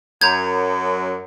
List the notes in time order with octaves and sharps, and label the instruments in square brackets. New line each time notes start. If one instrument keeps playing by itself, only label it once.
[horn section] F#2 [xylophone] A#5 G6 G#6